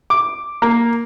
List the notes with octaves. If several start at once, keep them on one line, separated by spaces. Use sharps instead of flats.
D6
A#3